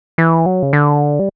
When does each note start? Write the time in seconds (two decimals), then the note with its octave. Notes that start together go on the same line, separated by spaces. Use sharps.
0.18 E3
0.46 F#3
0.63 C#3
0.73 D3
1.19 G3